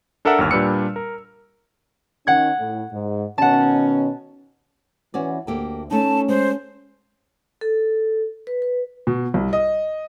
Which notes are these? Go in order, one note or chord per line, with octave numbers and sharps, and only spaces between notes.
D4 A4 A#4 E5 F#5 E6
G1 D#2 F6
A#2 G3 D4 B4 E6 C#7
A#4
D#3 C#4 F#5 G#6
A2
G#2
B2 D#3 C#4 F#5 A5
E3 C#4 F#4 D5
D2 A#3 G4 A4
A3 C#4 D#4 A5
G#3 C5
A4
B4
B4
B2
C2
D#5